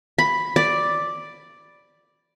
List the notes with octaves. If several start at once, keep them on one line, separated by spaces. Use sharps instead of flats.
B5
D5